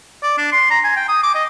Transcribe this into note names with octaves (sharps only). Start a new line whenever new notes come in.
D5
D4
C6
A#5
G#5
G5
D#6
D6
D#5